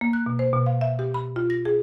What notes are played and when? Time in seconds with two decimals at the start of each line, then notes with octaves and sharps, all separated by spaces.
0.01 A#3
0.13 F#6
0.26 B2
0.39 C5
0.53 B2
0.66 F5
0.81 E5
0.99 G4
1.14 B5
1.36 F4
1.50 A#6
1.65 G#4